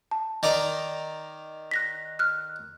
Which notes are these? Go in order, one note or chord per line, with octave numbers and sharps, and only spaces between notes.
A5
D#3 D5 D#5 A#5
F#6 A#6 B6
F6 F#6